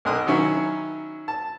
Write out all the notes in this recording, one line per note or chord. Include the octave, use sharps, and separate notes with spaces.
B1 D#4 A#4 C6 D#6 F#6
D#3 F#3 C#4 E4
A5